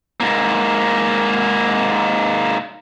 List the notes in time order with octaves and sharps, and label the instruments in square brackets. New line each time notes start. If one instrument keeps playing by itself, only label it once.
[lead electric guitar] G#2 A#3